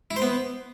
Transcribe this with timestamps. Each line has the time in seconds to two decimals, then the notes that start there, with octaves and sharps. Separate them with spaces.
0.11 E4
0.16 C5
0.22 B3